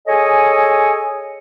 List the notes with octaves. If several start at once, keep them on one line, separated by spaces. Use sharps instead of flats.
G#4 A4 C#5 D#5 G#5